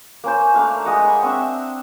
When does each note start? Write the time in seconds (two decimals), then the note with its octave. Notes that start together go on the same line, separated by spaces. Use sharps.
0.24 A#3 C#4 C5
0.54 A3 A#3 D4 F5
0.85 G#3 D#5 F#5
1.04 B5 C#6
1.23 C4 D4 E5